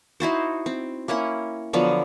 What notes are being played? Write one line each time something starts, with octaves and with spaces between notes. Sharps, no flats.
D#4 E4 F#4 C5
C4
A#3 C#4 E4 F#5
D3 F3 F#3 B3